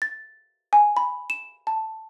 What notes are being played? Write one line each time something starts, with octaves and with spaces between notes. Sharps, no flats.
A6
G#5
B5
E7
A5